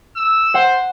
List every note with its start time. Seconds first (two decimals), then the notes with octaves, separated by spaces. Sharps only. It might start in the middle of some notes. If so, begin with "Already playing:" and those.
0.16 E6
0.54 C5 F#5